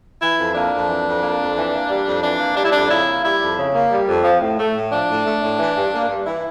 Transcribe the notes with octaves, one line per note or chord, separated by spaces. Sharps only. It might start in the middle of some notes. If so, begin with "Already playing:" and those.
E3 E4
F2
A#3 D4
F2
E3
F2
A#3
F2
E3
A#3
G3
F2
E3 D4
A#3
G3 D4
E4
F2 D4
C#3 E4
A#3
G3 E4
F2
C#3
A#3
G3
F2
F3
A2
A3
A2
F3 D4
A2
A3
A2
E3
G2
A#3
G2
E3 E4